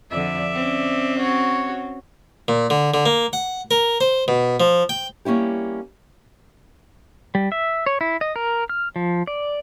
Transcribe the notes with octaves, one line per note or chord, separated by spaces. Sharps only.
F2 D3 D5 E5
C4 C#4
F#4 C#5
A#2
D3
D3
A#3
F#5
A#4
C5
B2
F3
G5
G3 A#3 C#4 E4 G4
G3
E5
C#5
E4
D#5
A#4
F6
F3
D5